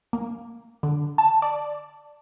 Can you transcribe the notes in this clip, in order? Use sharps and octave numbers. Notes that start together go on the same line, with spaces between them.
A#3
D3
A5
D5